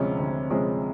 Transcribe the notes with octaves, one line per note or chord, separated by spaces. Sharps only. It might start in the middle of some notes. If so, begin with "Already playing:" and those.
Already playing: D2 C3 F3 G#3 C#4
D2
C3 F3 G#3 C#4